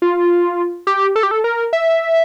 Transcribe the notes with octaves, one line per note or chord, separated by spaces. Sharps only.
F4
G4
A4
G4
A4
A#4
E5